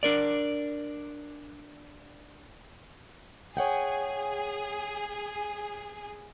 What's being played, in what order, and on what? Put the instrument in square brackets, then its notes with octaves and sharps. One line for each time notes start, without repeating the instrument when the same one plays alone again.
[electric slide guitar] D4 A#4 D5
[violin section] G#4 [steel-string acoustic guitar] C#5 F#5 G5